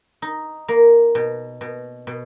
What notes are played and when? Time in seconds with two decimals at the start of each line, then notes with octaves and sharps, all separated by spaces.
0.22 D#4
0.68 A#3
1.15 B2
1.61 B2
2.07 B2